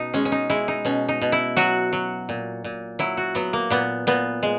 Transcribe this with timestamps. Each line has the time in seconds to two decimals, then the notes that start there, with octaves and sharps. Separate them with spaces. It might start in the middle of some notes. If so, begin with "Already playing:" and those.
Already playing: B2 D#4
0.14 G#3 C#4
0.25 C#4
0.32 D#4
0.50 G#3 E4
0.68 D#4
0.85 B2 C#4
1.09 D#4
1.21 B2
1.32 E4
1.57 F#3 F#4
1.93 F#3
2.29 A#2
2.64 A#2
2.99 F#3 E4
3.17 F#4
3.35 F#3 B3
3.53 A#3
3.70 A#2 B3
4.07 A#2 B3
4.43 G#3